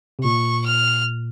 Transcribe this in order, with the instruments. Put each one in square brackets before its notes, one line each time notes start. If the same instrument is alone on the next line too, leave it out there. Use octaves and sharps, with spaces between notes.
[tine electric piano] C3
[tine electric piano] A#2 [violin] C#6
[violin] F6